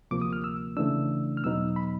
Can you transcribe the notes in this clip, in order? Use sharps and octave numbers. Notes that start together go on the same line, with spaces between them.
D2 C3 F3 A#3 D6
D#6
F6
E6
C#3 E3 A3 D4 E6
F6
E2 B2 F#3 B3 D#4 E6
B5